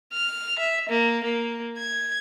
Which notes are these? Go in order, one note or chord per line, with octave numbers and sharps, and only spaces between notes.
F6
E5
A#3
A#3
G#6